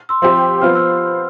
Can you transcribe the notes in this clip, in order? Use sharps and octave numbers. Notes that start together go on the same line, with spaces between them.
C6 E6
F3 C4 G4 C6 E6
F3 B3 F4 C5 F6
E6